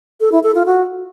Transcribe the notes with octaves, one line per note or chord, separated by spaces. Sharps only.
A4
E4
A4
F4
F#4